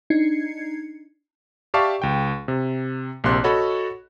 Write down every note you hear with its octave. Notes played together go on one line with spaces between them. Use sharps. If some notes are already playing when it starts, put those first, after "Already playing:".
D4 D#4 G#6 C7 C#7
G4 D5 E5 F5 A5 C#6
C#2 G5
C3
A#1 C3 A#3 C6 F#6
F#4 A4 C#5 D#5 B5